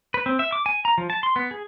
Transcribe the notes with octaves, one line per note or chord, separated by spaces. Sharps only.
B4
C4
E5
D6
G#5
A#5
F3
A5
C6
B3
G#4